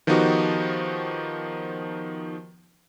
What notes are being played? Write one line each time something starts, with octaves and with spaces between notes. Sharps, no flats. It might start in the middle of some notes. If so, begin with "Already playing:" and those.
D#3 F3 B3 D#4 F#4 G4